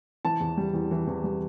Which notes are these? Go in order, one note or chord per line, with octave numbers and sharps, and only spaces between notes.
E3 A5
E2
G3
E2
E3
E2
G3